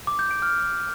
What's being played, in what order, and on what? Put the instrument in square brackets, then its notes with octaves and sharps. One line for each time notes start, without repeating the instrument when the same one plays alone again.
[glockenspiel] D6
G6
D7
F6